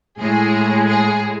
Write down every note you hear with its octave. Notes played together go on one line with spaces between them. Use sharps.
A2 G#3 G#4
G#4